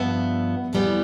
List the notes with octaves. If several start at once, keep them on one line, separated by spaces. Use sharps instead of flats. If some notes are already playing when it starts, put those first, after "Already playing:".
Already playing: G2 F3 B3 E5
F2 C3 E3 G3 B3